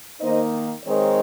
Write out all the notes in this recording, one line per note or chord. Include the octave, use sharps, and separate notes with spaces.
D#3 A#3 D#4 C5 D#5
D#3 G#3 C4 D#4 A#4 C#5